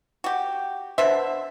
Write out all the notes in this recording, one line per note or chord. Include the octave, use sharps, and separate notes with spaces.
F#4 G4
B2 D4 C5 E5